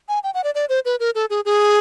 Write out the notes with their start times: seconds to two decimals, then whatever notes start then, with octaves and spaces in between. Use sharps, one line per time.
0.08 G#5
0.24 G5
0.34 F#5
0.44 D5
0.55 D5
0.69 C5
0.85 B4
1.00 A#4
1.15 A4
1.30 G#4
1.45 G#4